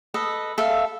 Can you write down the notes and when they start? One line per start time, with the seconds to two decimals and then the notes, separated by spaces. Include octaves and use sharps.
0.14 A4 B4 D#5
0.58 A4 E5 F5